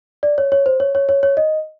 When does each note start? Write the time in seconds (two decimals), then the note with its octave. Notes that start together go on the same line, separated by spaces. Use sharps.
0.23 D5
0.38 C#5
0.52 C#5
0.66 C5
0.80 C#5
0.95 C#5
1.09 C#5
1.23 C#5
1.37 D#5